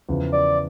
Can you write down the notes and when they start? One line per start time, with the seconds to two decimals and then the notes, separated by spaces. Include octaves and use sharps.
0.09 E2 C#3 F3
0.32 D5